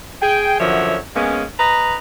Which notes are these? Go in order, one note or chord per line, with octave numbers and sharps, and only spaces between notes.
G#4 G5
F#2 D3 F3 C#5 E5
G#3 A#3 B3 C#4
B4 D#5 A#5